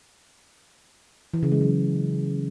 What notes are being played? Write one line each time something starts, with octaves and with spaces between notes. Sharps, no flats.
E3
C#3
G#3
F#3
G#3